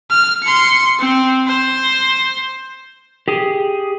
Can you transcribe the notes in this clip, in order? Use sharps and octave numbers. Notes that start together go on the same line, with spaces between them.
F6
C6 C#7
C4
C5
G4 G#4